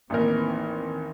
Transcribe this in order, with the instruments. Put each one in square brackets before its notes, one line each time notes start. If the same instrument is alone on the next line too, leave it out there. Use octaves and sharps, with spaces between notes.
[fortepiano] A1 D#2 A#4 [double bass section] D#3 E3 C4